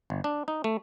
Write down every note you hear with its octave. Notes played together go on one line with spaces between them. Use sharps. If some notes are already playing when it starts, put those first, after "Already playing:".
G1
D4
D#4
A3